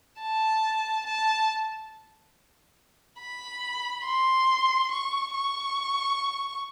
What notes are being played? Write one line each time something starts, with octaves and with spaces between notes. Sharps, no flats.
A5
A5
B5
C6
C#6
C#6